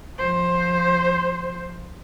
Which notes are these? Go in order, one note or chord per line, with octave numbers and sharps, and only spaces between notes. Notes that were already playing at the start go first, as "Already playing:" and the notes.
F3 C5